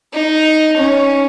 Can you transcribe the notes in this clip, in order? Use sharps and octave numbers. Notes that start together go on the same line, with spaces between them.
D#4
C#4